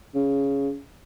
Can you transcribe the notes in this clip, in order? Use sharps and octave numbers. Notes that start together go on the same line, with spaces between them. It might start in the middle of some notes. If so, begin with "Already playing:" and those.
C#3